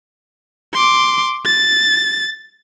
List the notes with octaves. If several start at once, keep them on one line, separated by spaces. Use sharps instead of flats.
C6 D6
A6